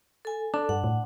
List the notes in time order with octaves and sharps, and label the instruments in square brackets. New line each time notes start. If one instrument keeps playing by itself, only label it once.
[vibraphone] A4 G#5
[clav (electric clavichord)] D4 [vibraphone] A4
[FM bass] G2 [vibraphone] F#5
[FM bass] A2